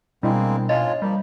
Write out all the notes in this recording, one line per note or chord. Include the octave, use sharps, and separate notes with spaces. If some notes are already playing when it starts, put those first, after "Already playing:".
B2 G3 G#3 A#3 C4 D4 E4 D#5
G#2 G#3 F4 C#5 D#5 A5 A#5
F3 G3 A#3